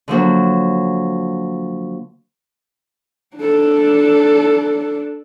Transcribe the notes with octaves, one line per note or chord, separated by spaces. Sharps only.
D3 F3 F#3 A#3
D4 A4